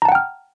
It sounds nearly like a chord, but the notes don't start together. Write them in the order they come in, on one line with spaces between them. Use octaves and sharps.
A#5 A5 F#5 G5 F6